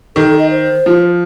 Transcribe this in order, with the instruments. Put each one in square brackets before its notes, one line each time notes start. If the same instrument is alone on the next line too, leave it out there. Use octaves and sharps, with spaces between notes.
[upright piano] D#3 [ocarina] A4
[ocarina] A4
D#5
C5
[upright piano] F3